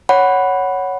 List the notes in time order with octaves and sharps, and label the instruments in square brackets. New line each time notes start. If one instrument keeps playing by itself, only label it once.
[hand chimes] C#5 F#5 B5